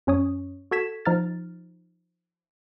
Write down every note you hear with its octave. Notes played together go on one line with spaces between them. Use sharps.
F#2 C#4 C#5 D#6
F#4 A4 G#6 B6 E7
F3 D#4 F6 A6